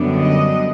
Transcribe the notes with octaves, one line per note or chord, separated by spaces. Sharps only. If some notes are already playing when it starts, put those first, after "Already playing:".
Already playing: F#2 D3 G3 B3 D4
D#5